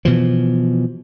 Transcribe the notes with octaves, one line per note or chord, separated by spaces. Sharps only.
B2 E3 F3